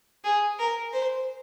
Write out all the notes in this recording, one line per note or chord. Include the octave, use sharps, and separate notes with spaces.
G#4
A#4
C5